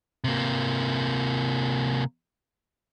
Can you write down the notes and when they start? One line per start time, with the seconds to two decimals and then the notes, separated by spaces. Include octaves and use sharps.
0.24 C3 A#3